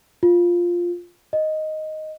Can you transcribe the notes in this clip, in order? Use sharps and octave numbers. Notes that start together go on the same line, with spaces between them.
F4
D#5